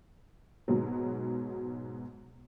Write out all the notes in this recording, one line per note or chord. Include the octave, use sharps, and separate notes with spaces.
G#2 B2 F#3